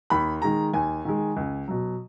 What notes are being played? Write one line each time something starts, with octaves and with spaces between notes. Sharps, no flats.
D#2 B5
D#3 G#3 A#5
D#2 G#5
D#3 G#3
C#2
B2 F#3